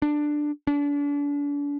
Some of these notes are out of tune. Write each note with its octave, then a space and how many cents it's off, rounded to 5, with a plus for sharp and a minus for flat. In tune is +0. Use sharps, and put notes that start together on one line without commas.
D4 +10
D4 -35